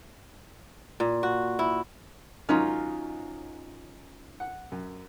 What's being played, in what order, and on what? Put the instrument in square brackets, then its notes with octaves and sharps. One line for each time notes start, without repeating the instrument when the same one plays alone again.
[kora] A#2
F#4
E4
[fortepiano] G#2 D#3 F#3 [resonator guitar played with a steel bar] C#4 D#4 F4
[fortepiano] F#5
F#2